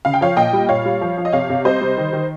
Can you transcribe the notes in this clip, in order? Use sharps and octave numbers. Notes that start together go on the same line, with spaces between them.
C#3 F5
G5
F3 C#5 F5
A#2 D#5 G5
G3
A#2 C#5 F5
G3
F3
F3
D#5
C3 C#5 F5
C3
G3 C5 D#5
G3
D#3
D#3